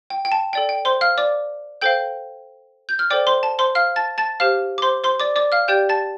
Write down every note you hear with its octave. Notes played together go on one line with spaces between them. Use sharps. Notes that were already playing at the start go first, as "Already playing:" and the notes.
G5
G5
A5
A4 D5 G5
G5
C5 C6
F5 F6
D5 D6
A4 C5 F5 G5 G6
G6
F6
A4 C5 D5 G5 D6
C5 C6
A5
C5 C6
F5 F6
A5 A6
A5 A6
G4 C5 F5 F6
D6
C5 C6
C5 C6
D5 D6
D5 D6
F5 F6
G4 D5 G5 G6
A5 A6